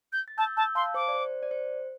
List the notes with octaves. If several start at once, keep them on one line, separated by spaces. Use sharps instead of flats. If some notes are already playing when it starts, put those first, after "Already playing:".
G6
A6
A5 E6 G6
A5 E6 G6
F5 A5 C6
C5 D6
D5
C5
D5
C5